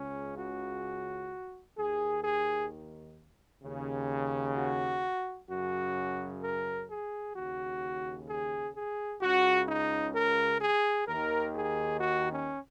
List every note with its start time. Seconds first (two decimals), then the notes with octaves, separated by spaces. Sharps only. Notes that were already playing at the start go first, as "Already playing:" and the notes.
Already playing: C#2 C#3 C#4
0.38 F#4
1.78 D#2 D#3 G#4
2.24 G#4
3.63 D#2 C#3
4.57 F#4
5.50 F#2 C#3 F#4
6.43 A#4
6.89 G#4
7.35 D#2 C#3 F#4
8.28 G#4
8.75 G#4
9.21 C#2 C#3 F#4
9.68 D#4
10.14 A#4
10.61 G#4
11.07 D#2 D#3 A#4
11.54 G#4
12.00 F#4
12.32 C#4